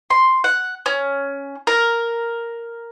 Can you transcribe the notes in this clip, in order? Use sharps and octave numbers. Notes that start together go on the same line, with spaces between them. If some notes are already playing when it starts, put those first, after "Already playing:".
C6
F#5
C#4
A#4